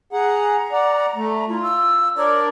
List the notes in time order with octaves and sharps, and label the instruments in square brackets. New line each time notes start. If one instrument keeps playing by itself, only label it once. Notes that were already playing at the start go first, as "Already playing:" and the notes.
[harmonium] G#4 F#5 [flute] A#5
[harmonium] D5 F#5
A3
[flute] E4 [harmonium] F4
[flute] E6
[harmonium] D4 A#4 D5 [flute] C#5